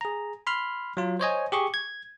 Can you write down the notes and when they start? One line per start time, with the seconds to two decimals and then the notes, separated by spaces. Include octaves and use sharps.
0.01 G#4 A#5
0.47 B5 C6 F6
0.97 F#3 F4
1.20 C5 C#5 D#5 G#5
1.52 G4 G#4 C#6
1.74 G#6